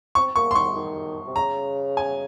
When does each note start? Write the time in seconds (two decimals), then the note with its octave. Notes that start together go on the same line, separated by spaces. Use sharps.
0.15 C4 C#6
0.36 A#3 C#6
0.51 C6
0.55 D#3 C#6
0.75 D#3
1.27 C3
1.36 C#3 A#5
1.97 G#5